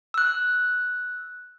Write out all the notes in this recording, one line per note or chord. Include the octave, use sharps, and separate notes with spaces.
E6 F#6